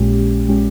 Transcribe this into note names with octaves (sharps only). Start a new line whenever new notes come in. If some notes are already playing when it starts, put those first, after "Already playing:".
Already playing: A#1 A#2 G#3 C#4 G4
A#2 G#3 C#4 G4